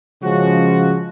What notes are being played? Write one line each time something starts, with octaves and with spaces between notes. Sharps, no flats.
C#3 F3 G#3 C#4 F#4